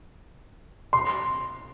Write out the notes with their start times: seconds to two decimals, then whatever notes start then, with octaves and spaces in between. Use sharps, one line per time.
0.93 C6